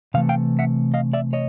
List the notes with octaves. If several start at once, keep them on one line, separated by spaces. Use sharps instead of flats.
C3 E3 A3 F5
F5 G5
E5 F#5
D#5 F5
D5 E5
C#5 D#5